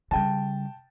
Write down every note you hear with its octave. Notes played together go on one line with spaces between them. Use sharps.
C#3 G3 G5 A5